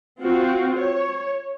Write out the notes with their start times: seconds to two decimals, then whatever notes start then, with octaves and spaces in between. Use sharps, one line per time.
0.22 C4 F4 F#4
0.77 C#5